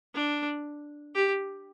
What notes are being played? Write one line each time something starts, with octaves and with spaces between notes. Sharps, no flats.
D4
G4